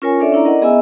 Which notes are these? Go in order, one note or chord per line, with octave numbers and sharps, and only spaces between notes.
C#4 F4 A#4 C#5 G#5
D4 A4 C#5 D5 E5
C#4 D4 E4 D5 A#5
A#4 D5 D#5 F#5
B3 G#4 D#5 E5 G#5 E6